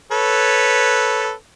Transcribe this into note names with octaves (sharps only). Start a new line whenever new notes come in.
A4 B4 C#5